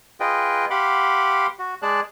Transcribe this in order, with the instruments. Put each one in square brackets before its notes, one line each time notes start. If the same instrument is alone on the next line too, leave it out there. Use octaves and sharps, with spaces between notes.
[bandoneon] F4 G#4 B4 D#5 G5
G4 F5 F#5 B5 C6 D6
F#4
G#3 G#4 D5 A5 F#6